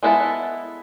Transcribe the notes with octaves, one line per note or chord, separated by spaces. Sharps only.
G#3 B3 E4 F#4 A4